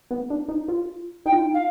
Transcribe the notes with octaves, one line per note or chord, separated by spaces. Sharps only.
B3
D4
D#4
F4
D#4 G5
F4
D#4
F5